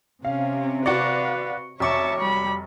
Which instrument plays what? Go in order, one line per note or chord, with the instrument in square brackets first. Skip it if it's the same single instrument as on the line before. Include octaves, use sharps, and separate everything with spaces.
[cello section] C3 [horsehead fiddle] C#4 [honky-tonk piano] F5
[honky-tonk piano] F#4 D5 [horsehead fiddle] B4 F5 [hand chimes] C#6 C#7
[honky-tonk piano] F1 C#6 [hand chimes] F#4 D6 C#7 [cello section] C#5 [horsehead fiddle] E5 A5
[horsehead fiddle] G3 B5